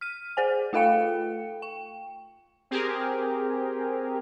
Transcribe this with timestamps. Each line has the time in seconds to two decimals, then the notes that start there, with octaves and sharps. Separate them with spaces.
0.01 F6 D#7
0.37 G#4 C5 G#5
0.73 A3 F4 A4 F5 G5 C#7
1.62 G5
2.71 C4 G4 G#4 A#4